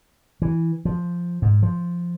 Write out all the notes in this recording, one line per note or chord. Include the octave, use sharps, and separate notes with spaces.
E3
F3
G#2
F3